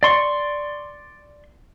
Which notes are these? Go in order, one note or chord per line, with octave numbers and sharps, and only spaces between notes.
D5 C6 C#6